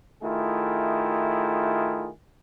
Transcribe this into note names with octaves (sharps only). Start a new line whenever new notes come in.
D#3 A3 E4 F4 G#4